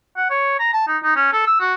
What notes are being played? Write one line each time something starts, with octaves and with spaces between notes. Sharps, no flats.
F#5
C#5
A#5
A5
D#4
D#4
C#4
A4
E6
F#4